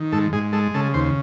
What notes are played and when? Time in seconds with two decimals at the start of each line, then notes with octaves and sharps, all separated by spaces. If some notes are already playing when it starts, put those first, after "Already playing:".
Already playing: D#3
0.12 G#2 A4
0.32 G#2 G#4
0.53 G#3 A4
0.74 C#3 A4
0.94 D#2 C5